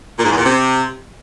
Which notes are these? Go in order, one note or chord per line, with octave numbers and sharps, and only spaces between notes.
A#2
G#2
E2
A#2
C3